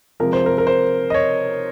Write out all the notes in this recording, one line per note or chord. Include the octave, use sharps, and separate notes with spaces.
C3 F3 G#3 A#4
C5
A#4
A#4
C5
D#5
C#5